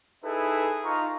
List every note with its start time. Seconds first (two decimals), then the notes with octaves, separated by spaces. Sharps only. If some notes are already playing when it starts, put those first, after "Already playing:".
0.24 D#4 E4 G#4 A4 B4
0.85 D#4 F4 F5 A#5 C#6